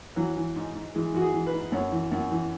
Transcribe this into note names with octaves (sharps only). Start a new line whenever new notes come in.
E3 F#3
E3
G#2
G#2
E3 G#3
E3 F#4
G#4
E3
B4
G#2
F#2 C#5
E3
F#2
E3